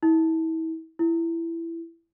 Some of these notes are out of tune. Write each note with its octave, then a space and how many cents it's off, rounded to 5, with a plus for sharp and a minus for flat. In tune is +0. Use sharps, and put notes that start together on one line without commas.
E4 -35
E4 +15